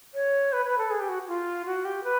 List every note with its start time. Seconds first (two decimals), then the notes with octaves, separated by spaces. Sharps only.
0.15 C#5
0.53 B4
0.66 B4
0.78 A4
0.90 G#4
1.00 G4
1.09 F#4
1.28 F4
1.66 F#4
1.85 G4
2.04 B4